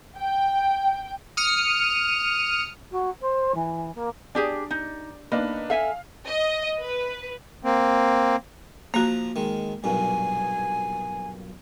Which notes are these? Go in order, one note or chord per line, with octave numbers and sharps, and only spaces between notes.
G5
D#6 F6 C#7
F#4
C5
E3
A#3
D4 G4 G#4 D5
D#4
A#3 D4 D#4 B4
A4 E5 F5 G#5
D#5
B4
A#3 C4
F3 A#3 F#4 A#5
D#3 G#3
B1 G2 A#2 G#5